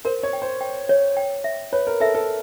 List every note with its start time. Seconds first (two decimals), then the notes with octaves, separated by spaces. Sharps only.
0.05 A#4 C5
0.23 C#5
0.33 G5
0.42 C5
0.61 G5
0.89 C#5
1.17 G5
1.44 E5
1.72 B4 C#5
1.87 A#4
2.00 A4 E5
2.15 A4